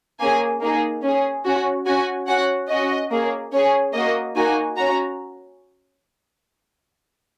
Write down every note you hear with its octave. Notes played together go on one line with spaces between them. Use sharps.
A#3 C#4 G#4 G#5
A#3 D#4 G#4
C#4 G#4
C#4 F#4
C#4 F#4 G#5
C#4 F#4 F#5
C#4 F#4 D#5
A#3 C#4 G#4
C#4 G#4 C#5
A#3 F#4 D#5
A#3 D#4 F#4 G#5
C#4 F#4 A#5